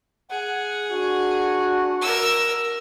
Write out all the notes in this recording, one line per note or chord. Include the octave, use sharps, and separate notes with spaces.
G#4 F#5
D4 F#4
A#4 E6